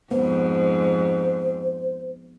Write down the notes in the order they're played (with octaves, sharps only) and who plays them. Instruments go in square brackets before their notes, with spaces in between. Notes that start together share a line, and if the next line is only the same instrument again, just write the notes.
[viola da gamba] F2 G#2 [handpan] B3 [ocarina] C5